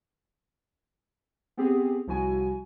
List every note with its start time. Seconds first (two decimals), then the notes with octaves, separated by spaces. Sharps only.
1.57 B3 C4 G4 G#4
2.07 C2 F3 E4 F#4 G#5